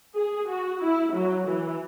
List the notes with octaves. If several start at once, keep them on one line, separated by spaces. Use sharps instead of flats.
G#4
F#4
E4
F#3
E3